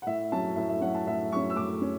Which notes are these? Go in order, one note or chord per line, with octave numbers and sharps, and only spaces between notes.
F#5
A2 E5
F#3 C#4 A5
A2 E5
E5
F#3 C#4 F#5
A5
A2 E5
F#3 C#4 C#6
E6
A2 D6
C#4